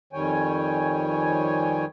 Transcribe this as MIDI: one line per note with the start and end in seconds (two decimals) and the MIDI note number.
0.13 1.85 41
0.13 1.85 51
0.13 1.85 55
0.13 1.85 73
0.13 1.85 79
0.13 1.85 80